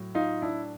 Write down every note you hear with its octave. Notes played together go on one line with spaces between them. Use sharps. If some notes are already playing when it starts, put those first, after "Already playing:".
Already playing: A2 F#3
D#4 F4
D4 E4